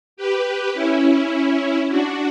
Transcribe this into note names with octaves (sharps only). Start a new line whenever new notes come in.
G4 B4
C#4 E4
D4 F#4